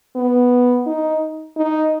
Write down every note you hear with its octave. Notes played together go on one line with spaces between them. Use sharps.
B3
D#4
D#4